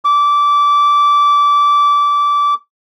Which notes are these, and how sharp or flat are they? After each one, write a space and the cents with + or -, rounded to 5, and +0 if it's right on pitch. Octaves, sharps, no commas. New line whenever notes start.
D6 -20